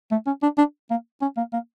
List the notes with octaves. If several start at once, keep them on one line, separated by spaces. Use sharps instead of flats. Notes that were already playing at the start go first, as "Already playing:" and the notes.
A3
C#4
D4
D4
A#3
C#4
A#3
A#3